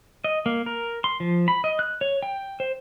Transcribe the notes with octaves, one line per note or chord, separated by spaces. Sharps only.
D#5
A#3
A#4
C6
F3
B5
D#5
F#6
C#5
G5
C5